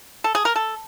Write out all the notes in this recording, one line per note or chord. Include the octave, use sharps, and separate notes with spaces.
A4
G#4
A#4
A4